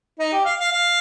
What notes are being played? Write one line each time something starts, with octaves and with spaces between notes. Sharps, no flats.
D#4
G4
F5
F5
F5